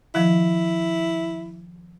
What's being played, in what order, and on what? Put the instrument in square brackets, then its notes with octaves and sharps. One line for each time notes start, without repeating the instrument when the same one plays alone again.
[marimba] D#3 F3 [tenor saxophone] E4